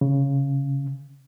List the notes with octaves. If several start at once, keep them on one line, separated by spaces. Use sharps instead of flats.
C#3